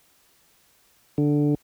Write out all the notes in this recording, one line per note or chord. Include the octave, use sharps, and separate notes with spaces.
D3